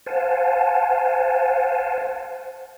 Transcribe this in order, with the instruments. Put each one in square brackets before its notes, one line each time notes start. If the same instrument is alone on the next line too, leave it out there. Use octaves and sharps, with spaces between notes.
[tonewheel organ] C5 F5 F#5 G#5 A5